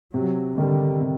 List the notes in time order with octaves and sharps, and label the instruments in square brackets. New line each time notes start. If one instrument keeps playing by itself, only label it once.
[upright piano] C3 [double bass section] F#3
[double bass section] D3 [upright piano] D#3 G3
[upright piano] C3